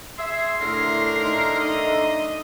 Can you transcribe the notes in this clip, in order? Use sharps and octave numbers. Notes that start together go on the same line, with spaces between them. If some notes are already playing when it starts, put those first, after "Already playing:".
G#4 E5 C6
A2 D3 A3 A#4
D#4
D#4 D#5